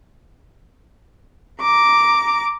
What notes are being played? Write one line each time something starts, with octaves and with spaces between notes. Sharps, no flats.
A#5 D6